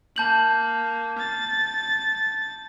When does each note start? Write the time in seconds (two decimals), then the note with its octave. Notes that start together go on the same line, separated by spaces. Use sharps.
0.16 A#3 A5 G6 F#7
1.19 A6